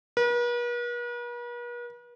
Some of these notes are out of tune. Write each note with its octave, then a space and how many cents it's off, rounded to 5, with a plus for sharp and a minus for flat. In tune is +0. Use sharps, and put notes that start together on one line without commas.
B4 -45